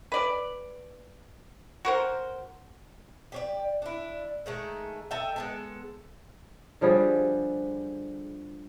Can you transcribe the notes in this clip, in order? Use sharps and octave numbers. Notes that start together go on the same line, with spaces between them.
B4 D5
F#4 A#4 C5
G4 C#5 D5
D4 E4
D#3 G#3 A3
A4 D#5 E5 G5
G#3 B3 A4
D3 F3 G3 G#4